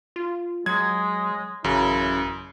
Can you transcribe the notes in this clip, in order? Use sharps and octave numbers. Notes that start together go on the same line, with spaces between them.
F4
F#3 G#3 G#6
A1 F#2 C#3 E4